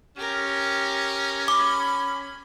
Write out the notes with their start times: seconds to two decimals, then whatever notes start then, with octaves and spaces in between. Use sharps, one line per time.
0.17 C#4 G4 A#4
1.48 B5 D6